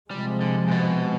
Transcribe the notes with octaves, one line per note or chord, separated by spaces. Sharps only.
C3 F3 G3 G#3
D3
G#2
B2